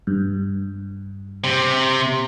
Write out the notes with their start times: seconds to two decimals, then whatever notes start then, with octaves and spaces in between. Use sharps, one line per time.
0.07 G2
1.44 C3